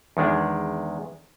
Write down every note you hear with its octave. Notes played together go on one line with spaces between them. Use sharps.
E2 D#3 G#3 D4